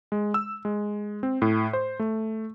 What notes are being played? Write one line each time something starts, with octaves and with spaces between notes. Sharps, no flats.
G#3
E6
G#3
C4
A2
C5
A3